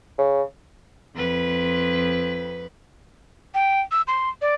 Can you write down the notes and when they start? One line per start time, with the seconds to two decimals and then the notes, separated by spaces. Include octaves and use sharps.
0.18 C#3
1.16 F2 B4
3.54 G5
3.91 E6
4.08 C6
4.42 D5